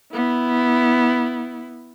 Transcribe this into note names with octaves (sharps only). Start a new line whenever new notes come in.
B3 E4